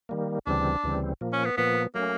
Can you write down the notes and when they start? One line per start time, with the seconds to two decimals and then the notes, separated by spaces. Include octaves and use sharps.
0.09 D#3 G3 A#3
0.46 D2 C#3 E3 G3 C4 D4
0.84 D2 C#3 E3 G3 C4
1.21 A#2 F3 A#3
1.33 C#4
1.45 B3
1.57 A#2 F3 A#3 B3
1.94 F#3 A3 A#3 C#4